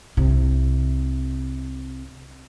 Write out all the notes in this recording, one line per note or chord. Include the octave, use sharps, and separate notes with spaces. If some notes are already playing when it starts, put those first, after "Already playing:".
C2 C3